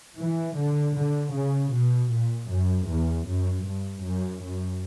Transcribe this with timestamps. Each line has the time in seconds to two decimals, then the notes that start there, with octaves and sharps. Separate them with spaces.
0.18 E3
0.56 D3
0.96 D3
1.33 C#3
1.72 B2
2.11 A#2
2.49 F#2
2.88 E2
3.26 F#2
3.65 G2
4.04 F#2
4.42 F#2